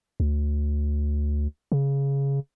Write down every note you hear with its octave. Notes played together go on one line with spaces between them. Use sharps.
D2
C#3